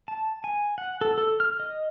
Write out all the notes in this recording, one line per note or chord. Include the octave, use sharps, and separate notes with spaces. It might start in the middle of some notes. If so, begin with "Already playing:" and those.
A5
G#5
F#5
A4
A4
F6
D#5